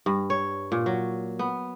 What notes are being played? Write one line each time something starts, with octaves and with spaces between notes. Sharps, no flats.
G2
C#5
A#2
F#3
B3